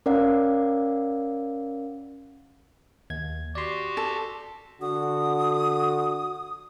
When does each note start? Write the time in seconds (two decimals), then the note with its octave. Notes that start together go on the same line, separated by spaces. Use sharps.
0.06 C#4 A#4 D5 F5 F#5
3.10 D#2 G#6
3.55 F#4 G4 D5 C6
3.97 A4
4.82 D3 F#4 D#6